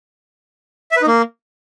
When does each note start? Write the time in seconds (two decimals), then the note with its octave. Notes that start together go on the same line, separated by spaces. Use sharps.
0.91 E5
0.97 B4
1.02 D#4
1.07 A#3